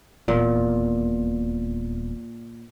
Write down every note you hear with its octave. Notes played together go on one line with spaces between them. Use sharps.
D#1 E2 A#2